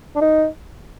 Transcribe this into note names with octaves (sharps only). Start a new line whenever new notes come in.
D4
D#4